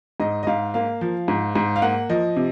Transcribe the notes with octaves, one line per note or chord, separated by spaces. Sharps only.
G#2 D#5
D#5
G#2 F5
A#3 F5
F3
G#2
G#2
F5
A#3 F#5
F3 D#5
C3